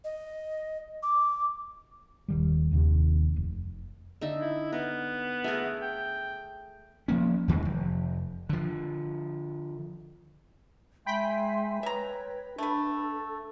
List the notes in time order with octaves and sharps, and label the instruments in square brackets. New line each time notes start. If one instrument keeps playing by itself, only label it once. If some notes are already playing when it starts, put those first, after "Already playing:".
[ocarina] D#5
D6
[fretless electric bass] D#1 D#3 G3
D#1 D#2 C3
F1
[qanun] D3 D#4 E5
[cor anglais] E4
[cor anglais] B3 [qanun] A#4
[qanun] A3 G#4 A#4
[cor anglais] G5
[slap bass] F3 A#3 C#4
E2 D#3 E3 G#3
F1
D3 F3
[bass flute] G#3 [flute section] E5 G#5 C6 [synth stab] G5 B5 B6
[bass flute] B4 [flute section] C#5 [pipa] E5 A#5
[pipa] A3 B4 [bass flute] D4 [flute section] A4